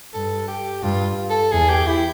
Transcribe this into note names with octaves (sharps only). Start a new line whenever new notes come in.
G2 A4
G4
G2 F4
A4
E2 G#4
G4
E4